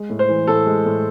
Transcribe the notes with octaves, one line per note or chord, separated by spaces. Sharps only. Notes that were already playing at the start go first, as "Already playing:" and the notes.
Already playing: G#3
A2
C5
E3
A2 A4
G#3
A2